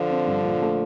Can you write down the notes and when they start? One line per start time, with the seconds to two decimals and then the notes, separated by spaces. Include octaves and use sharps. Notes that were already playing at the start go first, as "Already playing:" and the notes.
Already playing: D3 F3
0.10 C4
0.27 G2
0.44 A#1
0.62 A3